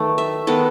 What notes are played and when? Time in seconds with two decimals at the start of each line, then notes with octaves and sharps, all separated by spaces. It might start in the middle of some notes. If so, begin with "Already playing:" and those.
Already playing: D#3 F#3 A3 B3
0.18 E5
0.47 D#3 G#3 B3 A4